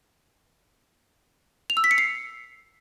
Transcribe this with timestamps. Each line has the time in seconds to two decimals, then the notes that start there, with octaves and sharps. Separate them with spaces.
1.70 F7
1.77 E6
1.84 B6
1.91 C#7
1.98 C7